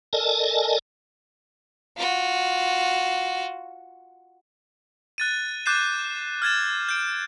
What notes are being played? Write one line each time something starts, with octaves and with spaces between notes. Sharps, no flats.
A4 A#4 D5 D#5 G#5 A5
F4 F#4
F#6 A6 D#7
D6 F#6 G6 A6 C7 E7
F6 G#6 A6 E7
G6 D7